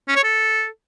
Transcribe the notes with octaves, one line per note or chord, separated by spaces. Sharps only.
C#4
C#5
A4